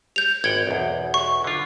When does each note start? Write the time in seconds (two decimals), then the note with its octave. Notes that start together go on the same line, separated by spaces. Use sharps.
0.16 G6 F7
0.44 G#1 F#5 G5 G#6
0.67 B1 E2
1.14 C#6
1.44 D3 F4